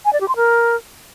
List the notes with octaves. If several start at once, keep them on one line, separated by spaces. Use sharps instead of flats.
G#5
D5
G4
C6
A#4